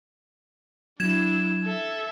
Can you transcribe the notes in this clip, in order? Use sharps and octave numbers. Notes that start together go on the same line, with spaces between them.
F#3 D4 E4 G#6 E7
A4 E5